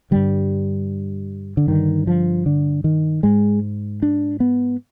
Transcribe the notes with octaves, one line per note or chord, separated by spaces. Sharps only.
G2 D3 G3
D3
G2 D3 D#3
F3
D3
D#3
G#2 G#3
D4
B3